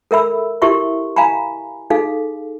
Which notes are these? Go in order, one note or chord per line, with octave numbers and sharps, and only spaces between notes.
A4 A#4 E5 B5 E6
E4 G4 A#4 E5 C6 C#6
F5 G#5 A#5 B5
D#4 G#4 A4 F5